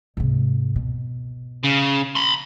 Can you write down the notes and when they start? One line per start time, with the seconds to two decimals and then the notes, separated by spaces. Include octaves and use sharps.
0.17 G#2 C3
0.76 B2
1.63 C#3
2.15 B5 C6